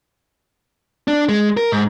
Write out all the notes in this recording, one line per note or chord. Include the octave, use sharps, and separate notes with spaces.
D4
G#3
A#4
G#2